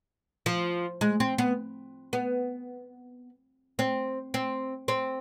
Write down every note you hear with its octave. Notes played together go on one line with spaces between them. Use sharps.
F3
G#3
C4
B3
B3
C4
C4
C4